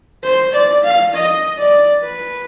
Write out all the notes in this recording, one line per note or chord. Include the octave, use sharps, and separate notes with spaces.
C5
D5
F5
D#5
D5
B4